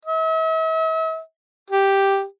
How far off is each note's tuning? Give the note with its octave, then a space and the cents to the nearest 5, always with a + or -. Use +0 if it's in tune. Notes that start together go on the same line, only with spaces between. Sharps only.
E5 -45
G4 +0